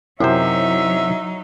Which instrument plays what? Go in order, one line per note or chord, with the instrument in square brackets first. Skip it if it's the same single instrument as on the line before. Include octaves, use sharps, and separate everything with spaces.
[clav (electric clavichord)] F#2 C3 C5 [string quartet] F#3 D#4 [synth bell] E4 [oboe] E5